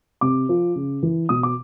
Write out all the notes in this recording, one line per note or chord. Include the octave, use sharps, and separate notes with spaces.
C3 D6
F3
C#3
E3
B2 D#6
D6